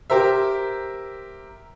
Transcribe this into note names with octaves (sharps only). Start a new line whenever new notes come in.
G4 A#4 C5 E5